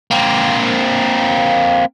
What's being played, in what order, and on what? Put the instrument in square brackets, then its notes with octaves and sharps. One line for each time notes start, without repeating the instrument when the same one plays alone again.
[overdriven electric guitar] A#3 C4